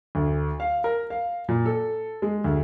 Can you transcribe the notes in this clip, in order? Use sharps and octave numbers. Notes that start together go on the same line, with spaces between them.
D2
F5
A#4
F5
A#2
A4
G#3
D2